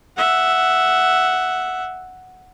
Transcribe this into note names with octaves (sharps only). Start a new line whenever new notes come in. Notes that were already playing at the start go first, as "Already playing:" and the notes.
E5 F#5